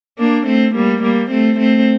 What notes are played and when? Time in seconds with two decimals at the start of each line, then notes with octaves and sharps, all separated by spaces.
0.19 A#3 D4
0.46 A3 C4
0.75 G3 A#3
1.02 G3 A#3
1.30 A3 C4
1.58 A3 C4